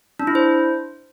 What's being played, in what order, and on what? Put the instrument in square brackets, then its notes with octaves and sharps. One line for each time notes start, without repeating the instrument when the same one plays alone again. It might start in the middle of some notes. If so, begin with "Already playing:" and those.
[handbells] D4
E4
C5